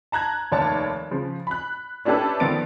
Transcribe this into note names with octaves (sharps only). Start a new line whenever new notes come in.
A5 A#5 F#6 G#6
F1 D#2 C#5 D5 A5
C#3 F3
B5 F#6
C#4 D4 E4 G4 A4 B4
D#3 F3 B3 A6 D7